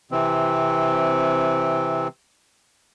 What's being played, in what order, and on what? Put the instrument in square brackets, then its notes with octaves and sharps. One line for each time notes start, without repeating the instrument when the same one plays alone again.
[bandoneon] C3 E3 C4